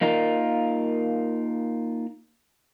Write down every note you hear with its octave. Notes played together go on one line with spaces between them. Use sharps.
A#3 D#4 F4 A#4